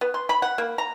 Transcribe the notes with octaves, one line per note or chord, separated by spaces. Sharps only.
B3
C6
B5
F#5
A#3
A#5